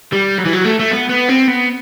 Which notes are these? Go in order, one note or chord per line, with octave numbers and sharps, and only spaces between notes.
G3
F#3
E3
F#3
A3
A3
B3
B3
C4
B3